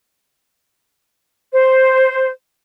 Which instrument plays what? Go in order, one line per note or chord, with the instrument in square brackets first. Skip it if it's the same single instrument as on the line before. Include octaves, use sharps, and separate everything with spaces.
[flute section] C5